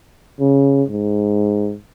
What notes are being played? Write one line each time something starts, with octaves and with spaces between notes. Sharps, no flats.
C#3
G#2